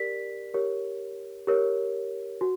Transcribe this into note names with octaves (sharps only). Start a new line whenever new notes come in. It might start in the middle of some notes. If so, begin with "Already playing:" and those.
Already playing: G4 A#4 D5 B6
G4 A#4 C#5
G4 A#4 C#5
F#4